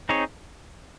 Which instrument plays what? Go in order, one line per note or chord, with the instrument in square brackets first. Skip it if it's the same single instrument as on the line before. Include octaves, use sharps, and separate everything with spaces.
[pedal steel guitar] C4 D#4 G#4 C#5